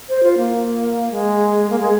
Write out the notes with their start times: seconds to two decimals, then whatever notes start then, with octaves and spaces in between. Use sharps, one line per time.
0.09 C5
0.23 F4
0.37 A#3
1.11 G#3
1.70 A#3
1.79 G#3